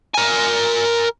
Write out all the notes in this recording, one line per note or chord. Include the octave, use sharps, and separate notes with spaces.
A#4 G#5